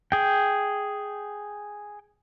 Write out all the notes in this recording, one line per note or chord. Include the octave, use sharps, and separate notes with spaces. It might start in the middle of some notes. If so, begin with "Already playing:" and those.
G#4 G5